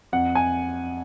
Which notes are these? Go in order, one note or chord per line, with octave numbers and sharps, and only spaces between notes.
F2 F#5
G#5